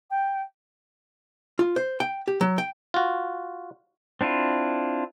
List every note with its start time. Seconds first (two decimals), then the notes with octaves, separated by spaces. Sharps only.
0.10 G5
1.59 F4
1.76 C5
2.00 G5
2.28 G4
2.41 F#3
2.58 G5
2.94 F4 F#4
4.21 C4 D4 E4 F4